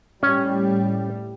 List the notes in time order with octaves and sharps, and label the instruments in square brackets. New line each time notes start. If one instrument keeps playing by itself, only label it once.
[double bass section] A2 G3 [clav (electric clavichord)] C#4